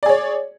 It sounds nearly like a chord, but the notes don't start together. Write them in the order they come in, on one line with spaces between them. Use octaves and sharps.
D5 G#4 C#5